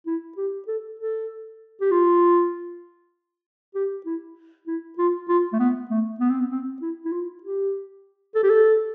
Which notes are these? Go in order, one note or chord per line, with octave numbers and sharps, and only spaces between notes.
E4
G4
A4
A4
G4
F4
G4
E4
E4
F4
F4
A3
B3
A3
B3
C4
B3
C4
E4
E4
F4
G4
A4
G4
A4